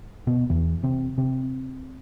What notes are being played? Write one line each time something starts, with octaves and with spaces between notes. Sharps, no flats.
B2 B3
E2 E3
C3 C4
C3 C4